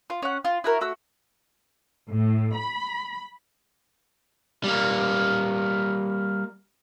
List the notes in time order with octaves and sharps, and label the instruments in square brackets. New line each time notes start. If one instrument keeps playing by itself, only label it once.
[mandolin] F4
C#4 F#5
F4
E4 F#4 A#4
A3 F#4 E6
[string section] A2
B5
[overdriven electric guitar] G3 A#3